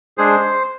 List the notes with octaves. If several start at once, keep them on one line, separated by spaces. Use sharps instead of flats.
G#3 D4 G#4 C5